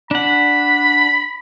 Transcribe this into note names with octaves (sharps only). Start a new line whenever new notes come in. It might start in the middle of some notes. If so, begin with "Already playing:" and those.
D4 F#5 B5